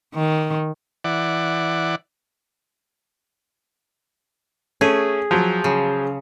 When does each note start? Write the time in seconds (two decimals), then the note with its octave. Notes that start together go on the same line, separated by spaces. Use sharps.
0.15 D#3
1.04 E3 D5 F#5
4.81 A3 C#4 G#4
5.31 F3 F#3
5.64 C#3